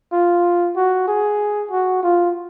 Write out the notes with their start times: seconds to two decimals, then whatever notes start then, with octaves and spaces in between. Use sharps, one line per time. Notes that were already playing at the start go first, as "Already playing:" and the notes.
0.13 F4
0.76 F#4
1.08 G#4
1.71 F#4
2.03 F4